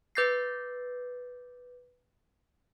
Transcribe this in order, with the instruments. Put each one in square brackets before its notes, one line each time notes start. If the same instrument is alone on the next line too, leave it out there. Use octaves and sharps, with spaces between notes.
[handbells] B4 D6 G6 A6 A#6 C7